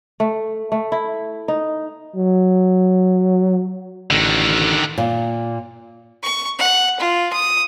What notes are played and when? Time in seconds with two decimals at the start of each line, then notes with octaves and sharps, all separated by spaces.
0.20 A3
0.72 A3
0.92 E4
1.48 D#4
2.16 F#3
4.11 A1 D3 D#3
4.98 A#2
6.23 C#6
6.59 F#5
7.00 F4
7.33 D#6